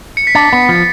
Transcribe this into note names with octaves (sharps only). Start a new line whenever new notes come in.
C#7
B6
D4 A6
B3
F3